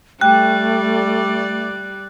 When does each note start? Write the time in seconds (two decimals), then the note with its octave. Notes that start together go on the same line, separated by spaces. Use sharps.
0.21 G3 A3 D5 G5 F#6